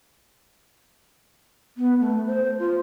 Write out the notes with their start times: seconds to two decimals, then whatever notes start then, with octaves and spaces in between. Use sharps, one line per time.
1.77 B3
2.00 A3
2.27 C5
2.59 F4